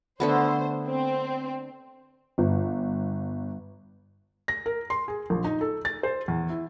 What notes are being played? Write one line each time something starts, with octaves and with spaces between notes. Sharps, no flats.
D3 A3 B3 C5
C4
G1
A#6
A#4
C6
G#4
A#1
D#4
A4
A6
C5
E2
E4